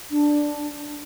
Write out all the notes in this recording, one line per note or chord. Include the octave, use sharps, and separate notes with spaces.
D4